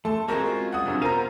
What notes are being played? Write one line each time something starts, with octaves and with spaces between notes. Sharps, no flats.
A3 A5 C6
G#3 C4 C#4 F4 F#4 A#4
G3 F#5 D#6
F#2 C3 D4
B3 F4 A#4 C5 F5 A#5 D#7